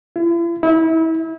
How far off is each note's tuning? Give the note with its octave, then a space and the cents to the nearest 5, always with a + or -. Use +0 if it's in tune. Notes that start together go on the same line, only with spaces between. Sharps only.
E4 +45
E4 -30